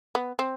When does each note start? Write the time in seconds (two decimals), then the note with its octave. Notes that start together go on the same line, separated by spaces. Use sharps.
0.15 B3
0.39 C4